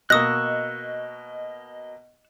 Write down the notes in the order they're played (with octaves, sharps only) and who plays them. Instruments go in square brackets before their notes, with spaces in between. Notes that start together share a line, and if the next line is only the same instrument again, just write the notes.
[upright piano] B2 A#3 [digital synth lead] D#5 [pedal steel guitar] C#6 E6 F#6 [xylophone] D#6 A#6